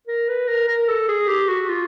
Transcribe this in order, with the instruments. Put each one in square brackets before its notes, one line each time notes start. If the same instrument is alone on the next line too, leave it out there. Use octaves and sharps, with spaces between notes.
[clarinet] A#4
B4
A#4
A#4
A4
G#4
G4
F#4
F4